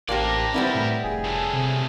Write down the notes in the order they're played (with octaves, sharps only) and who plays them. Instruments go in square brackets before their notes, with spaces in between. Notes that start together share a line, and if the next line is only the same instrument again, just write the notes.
[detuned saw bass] A1 [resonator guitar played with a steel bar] A#3 C4 G4 [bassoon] D4 [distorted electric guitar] A#4 D5
[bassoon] C2 [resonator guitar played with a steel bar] G3 B3 E4 [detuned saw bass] C4
[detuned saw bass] A2
[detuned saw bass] F1 [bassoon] G#4
[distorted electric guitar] C#3 A3
[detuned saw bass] C3